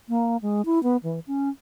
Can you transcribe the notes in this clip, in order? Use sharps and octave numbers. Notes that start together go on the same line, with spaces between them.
A#3
G#3
E4
B3
E3
C#4